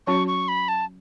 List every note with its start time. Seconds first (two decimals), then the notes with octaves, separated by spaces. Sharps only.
0.07 F#3 C#4 F#4 C#5 C#6
0.28 C#6
0.48 B5
0.68 A5